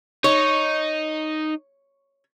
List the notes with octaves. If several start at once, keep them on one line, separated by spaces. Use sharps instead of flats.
D#4 C#5